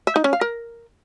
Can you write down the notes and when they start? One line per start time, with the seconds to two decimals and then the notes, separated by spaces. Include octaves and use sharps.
0.07 E5
0.16 D#4
0.24 C#4
0.33 F5
0.41 A#4